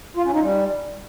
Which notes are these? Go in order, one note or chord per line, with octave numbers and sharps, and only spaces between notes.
F4
C#4
D#4
G3